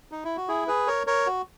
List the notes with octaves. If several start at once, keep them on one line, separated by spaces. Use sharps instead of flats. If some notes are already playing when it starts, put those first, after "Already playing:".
D#4
E4
F#4
E4 G#4
G#4 B4
A#4 C#5
A#4 C#5
F#4